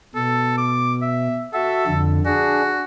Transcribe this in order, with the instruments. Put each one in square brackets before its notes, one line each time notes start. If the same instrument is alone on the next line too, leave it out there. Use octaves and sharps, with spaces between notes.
[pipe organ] B2 [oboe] A4
[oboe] D6
E5
[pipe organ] F#4 E5 [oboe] A4
[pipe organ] F2 D3
[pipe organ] D4 G#4 [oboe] F#4